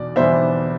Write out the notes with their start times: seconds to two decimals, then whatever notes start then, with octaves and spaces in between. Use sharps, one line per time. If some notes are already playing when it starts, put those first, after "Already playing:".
Already playing: E2 B2 D5
0.16 E2 B2 G3 B3 C5 E5